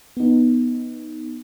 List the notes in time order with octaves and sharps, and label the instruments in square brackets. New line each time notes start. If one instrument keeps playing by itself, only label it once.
[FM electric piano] B3 D#4